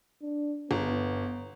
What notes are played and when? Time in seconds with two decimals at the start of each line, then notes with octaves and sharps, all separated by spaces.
0.22 D4
0.71 G1 B3